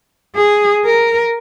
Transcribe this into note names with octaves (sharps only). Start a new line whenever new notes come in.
G#4
A#4